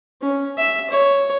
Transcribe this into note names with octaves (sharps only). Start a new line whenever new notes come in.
C#4
E5
C#5